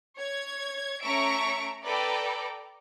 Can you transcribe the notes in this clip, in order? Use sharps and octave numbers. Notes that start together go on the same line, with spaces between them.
C#5 G#6
A3 C#4 E5 A#5 C#6 D7
A4 B4 D5 G5 A#5